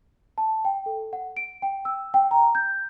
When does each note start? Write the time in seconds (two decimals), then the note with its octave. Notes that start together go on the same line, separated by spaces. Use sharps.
0.38 A5
0.65 G5
0.86 A4
1.13 F#5
1.37 D7
1.62 G5
1.85 E6
2.14 G5
2.31 A#5
2.55 G6